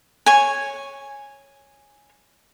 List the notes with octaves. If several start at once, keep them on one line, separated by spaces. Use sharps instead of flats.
C#5 G#5